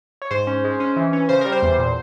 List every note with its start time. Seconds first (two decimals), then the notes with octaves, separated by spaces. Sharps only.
0.22 C#5
0.31 G#2 C5
0.47 C#4
0.64 G#3
0.80 C#4
0.96 E3
1.13 C#4
1.29 C#3 C5
1.41 G3 A#4
1.52 C5
1.62 E2
1.78 A#2